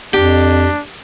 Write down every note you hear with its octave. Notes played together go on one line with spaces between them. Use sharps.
F2 D4 G4